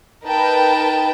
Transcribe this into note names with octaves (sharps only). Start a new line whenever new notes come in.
D#4 A#4 B4 G5 A5